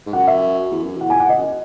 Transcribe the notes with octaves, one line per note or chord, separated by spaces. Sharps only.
G#2
F#2 F#5
E5
E2
F#2
E2 F#5
G#5
F#5
D#5
F#2